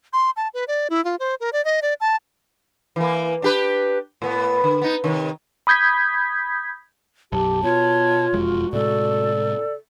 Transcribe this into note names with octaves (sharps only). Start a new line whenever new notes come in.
C6
A5
B4
D5
E4
F4
C5
A#4
D5
D#5
D5
A5
E3 A#3
D4 G4 B4
A2 B3
D3
B3 D#4
C3 D#3
B5 D#6 G6 G#6 B6
B1 F#2 G4 A5
B2 F4 C#5
E1 F2 G#3 F#4
A2 C3 G#3 A4 D5